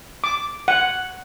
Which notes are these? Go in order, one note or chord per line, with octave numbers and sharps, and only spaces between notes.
D6
F#5